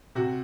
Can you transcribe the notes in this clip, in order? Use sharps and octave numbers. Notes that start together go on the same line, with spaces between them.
C3 F#4